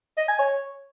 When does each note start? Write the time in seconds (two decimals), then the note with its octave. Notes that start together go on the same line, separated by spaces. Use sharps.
0.18 D#5
0.28 G#5
0.39 C#5